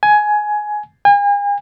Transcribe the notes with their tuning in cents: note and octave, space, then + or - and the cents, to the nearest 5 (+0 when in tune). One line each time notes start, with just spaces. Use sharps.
G#5 +15
G#5 -40